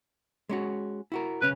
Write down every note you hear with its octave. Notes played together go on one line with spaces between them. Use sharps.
G#3 C#4 F#4
E4 F#4 A#4
B1 C#3 C#4 B4